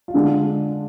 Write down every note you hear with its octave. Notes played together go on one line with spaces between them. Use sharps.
F4
D3 G#3 D4